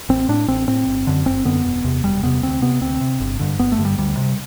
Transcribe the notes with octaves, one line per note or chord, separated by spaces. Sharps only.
A1 C4
A2 D4
A1 C4
A2 C4
G1
F#2 D3
G1 C4
F#2 D3 B3
E1
E2 C3
E1 G3
E2 C3 B3
D2 C4
C3 B3
D2 C4
C3
G1
G2 D3
G1 B3
A3
G2 D3
G3
D2 G3
C3